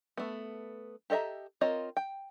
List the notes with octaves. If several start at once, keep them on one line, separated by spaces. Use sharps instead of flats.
A3 B3
G4 A4 D#5 E5 A#5
C4 F4 A#4 C#5 D#5
G5